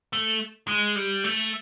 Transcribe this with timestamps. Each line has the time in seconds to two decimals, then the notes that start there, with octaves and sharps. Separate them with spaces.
0.13 A3
0.68 G#3
0.96 G3
1.24 A3